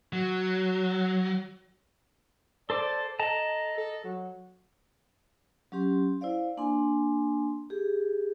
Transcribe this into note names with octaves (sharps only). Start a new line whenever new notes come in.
F#3
A4 C5 D5 D6
A4 D#5 A5 A#5
A4
F#3
F#3 C#4 G4 C6
E4 C5 D5 F5
A#3 D4 G#5 C6
G4 G#4